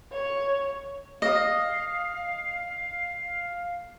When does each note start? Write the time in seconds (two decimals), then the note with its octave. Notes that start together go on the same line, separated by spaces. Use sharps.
0.12 C#5
1.22 D#5 F5